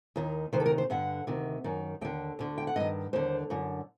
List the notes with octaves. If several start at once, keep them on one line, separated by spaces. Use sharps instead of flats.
D#2 D#3
D2 C3 D#3 C5
A4
A#4
C5
G2 D3 F#5
D2 C3 D#3
F#2 D#3
D#2 D3 G5
D2 D3
G5
F#5
G2 D#3 D#5
D#2 D3 C5
F#2 D3